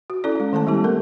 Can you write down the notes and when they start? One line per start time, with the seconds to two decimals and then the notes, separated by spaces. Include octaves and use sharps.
0.10 F#4
0.24 C#4 E4 A4 D5
0.35 G#3 C#4
0.53 D#3 A3 A4 A5
0.67 G3 B3 E4 G4
0.84 A#3 A4 A#4